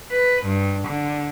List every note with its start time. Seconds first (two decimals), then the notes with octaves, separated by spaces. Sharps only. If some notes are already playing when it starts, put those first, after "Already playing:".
0.12 B4
0.45 G2
0.87 D3